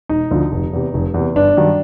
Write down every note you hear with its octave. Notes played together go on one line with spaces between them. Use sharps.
E1 D#4
D2 D3 F3
F1
E2 C3
F1
E2 C3
G1 D4
G2 D#3 F#3